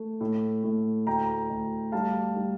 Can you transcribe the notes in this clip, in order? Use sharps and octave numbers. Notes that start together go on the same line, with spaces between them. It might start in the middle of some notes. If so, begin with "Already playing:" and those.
Already playing: A3
A2
A2
D2 G5 A#5
D2
G3 F5 A5
G3